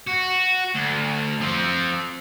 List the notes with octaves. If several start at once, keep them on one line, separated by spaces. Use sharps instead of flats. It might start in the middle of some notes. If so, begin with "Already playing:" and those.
F#4
D2
F3 C4